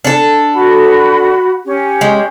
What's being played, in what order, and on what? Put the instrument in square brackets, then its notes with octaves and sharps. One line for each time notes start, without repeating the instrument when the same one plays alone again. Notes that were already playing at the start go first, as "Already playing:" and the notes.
[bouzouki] D4 A4
[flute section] F#4 F#5 B5
C#4 G4
[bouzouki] G#3